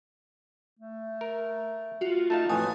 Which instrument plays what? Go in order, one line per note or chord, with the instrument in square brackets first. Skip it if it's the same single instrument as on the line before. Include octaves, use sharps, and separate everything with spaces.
[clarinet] A3
[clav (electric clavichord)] A#4
[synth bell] F4 F#4
[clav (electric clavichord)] A3 D#4 F5 [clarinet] A5
[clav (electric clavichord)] A1 F2 A2 [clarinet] B4 [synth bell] G#5 D#6